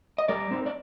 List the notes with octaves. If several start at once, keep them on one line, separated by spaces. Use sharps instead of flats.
D#5
G3 A#4 D5
C4 D#4
D5